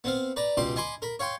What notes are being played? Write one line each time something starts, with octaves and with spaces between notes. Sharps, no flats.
B3 C4 F5
B4 D5 A#5
C#2 B2 G4 C6 D6
D#5 G#5 B5 C6 D6
A#4 B5
C#5 F5 G5 C6